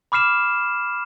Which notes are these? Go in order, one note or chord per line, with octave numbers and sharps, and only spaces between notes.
B5 D6 F6 C7 E7